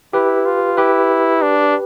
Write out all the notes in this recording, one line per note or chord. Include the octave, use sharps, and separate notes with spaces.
E4 G4 B4
F4
E4 G4 B4
D4